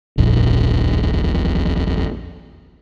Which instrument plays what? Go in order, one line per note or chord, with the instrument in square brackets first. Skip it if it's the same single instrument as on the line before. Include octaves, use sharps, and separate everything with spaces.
[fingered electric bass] D#1 A#1 F2